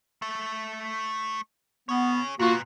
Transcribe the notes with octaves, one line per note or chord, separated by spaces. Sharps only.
A3 E5
B3 G#4 C#5
A#2 A#3 B3 F4 F#4